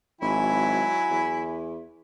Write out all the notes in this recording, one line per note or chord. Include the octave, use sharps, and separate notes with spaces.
G#1 F#3 E4 G#5
E2